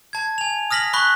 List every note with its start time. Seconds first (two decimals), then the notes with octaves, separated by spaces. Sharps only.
0.13 A5 G#6
0.38 G#5 F7
0.71 D#6 F6 A#6 B6 F#7
0.93 B5 C#6 F#6 B6 G7